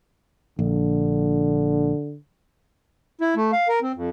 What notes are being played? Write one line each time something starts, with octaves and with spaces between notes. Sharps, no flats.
A#1 D3
E4
A3
F5
A#4
C4
F2